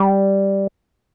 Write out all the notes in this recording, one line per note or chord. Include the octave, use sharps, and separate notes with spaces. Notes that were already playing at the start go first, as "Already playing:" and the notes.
Already playing: G3